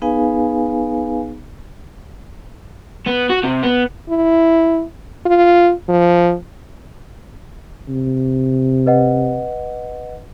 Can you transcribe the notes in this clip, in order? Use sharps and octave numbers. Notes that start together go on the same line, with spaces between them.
B3 D#4 G#4 B4 F5 G#5
B3
F#4
C3
B3
E4
F4
F3
C3
B4 D#5 F#5